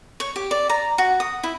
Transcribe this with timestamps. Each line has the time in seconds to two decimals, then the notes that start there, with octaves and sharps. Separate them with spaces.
0.20 C#5
0.36 G4
0.51 D5
0.69 A#5
0.98 F#4
1.20 D#6
1.43 E4